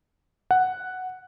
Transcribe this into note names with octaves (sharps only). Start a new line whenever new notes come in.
F#5